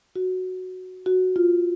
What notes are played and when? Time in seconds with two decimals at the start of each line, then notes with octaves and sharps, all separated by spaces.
0.16 F#4
1.06 F#4
1.36 F4